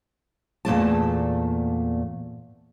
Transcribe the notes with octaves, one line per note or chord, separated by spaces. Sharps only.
E2 A#2 A3 A5